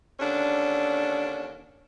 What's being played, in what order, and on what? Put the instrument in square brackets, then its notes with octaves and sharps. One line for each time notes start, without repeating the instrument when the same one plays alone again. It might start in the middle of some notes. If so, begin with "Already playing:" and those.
[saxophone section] D#2 D3 C#4 D4